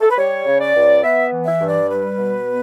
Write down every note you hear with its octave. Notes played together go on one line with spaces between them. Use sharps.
A4
B4
G3 C#5
C#3
D5
C#2
B3 E5
E3
E5
G2
D5
G3 B4
B2
B3